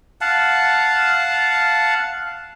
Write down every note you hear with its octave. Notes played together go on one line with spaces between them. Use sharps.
F5 F#5 A5